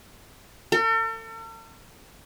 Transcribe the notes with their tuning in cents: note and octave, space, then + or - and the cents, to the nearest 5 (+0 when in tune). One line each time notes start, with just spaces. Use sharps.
A4 +45